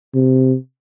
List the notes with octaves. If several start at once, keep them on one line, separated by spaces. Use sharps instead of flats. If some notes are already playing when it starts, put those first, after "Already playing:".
C3